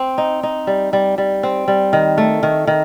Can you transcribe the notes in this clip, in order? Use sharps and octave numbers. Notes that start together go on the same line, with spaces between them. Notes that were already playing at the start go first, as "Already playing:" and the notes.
Already playing: C4
D#4
D#4
G3
G3
G3
C4
G3
D#3
A3
D#3
D#3